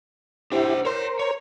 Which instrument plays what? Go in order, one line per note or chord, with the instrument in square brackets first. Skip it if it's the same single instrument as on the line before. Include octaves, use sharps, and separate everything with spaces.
[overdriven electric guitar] D4 C5 [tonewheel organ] E4 G4
[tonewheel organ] A#4 C5 [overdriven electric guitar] C#5 C6
[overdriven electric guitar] C#5